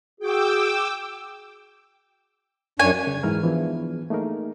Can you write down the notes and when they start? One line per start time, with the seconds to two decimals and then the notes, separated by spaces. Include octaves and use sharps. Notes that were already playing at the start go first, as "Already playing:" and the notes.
0.20 F#4 G#4 G5 D6 E6
2.80 F#2 D4 C#5 G#5
3.07 C#3
3.23 G#2 E3 E4 G#4 A#4 F6
3.43 E3 F3 B3 D4 G#4
4.10 A3 A#3 D#4 G#4 A#4